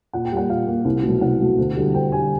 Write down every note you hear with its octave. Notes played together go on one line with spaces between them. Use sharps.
A#2 F#5
G5
G3 A#3 F#5
A#2 F5
G3 A#3
C2
B2 F#3 A3
C2 F#5
B2 F#3 A3
D2
D3 G3
D2 G5
D3 G3 G#5